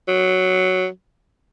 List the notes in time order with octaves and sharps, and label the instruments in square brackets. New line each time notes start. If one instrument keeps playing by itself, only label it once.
[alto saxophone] F#3